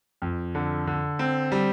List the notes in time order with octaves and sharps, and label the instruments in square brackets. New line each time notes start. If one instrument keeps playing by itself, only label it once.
[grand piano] F2
D3
D3
C4
G3